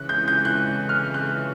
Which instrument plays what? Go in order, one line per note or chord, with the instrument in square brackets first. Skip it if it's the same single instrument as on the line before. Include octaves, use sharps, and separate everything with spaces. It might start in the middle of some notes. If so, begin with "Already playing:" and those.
Already playing: [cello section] C#3 E3 G#3 C#4 [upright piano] F#6
[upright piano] G6
G6
F#6
F6
F#6